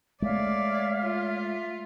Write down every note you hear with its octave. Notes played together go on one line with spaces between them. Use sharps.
G#3 A3 C#5 D5 E5 F5
F4
E5